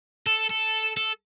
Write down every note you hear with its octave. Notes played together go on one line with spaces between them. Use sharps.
A4
A4
A4